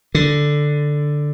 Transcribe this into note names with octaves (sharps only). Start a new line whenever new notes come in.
D3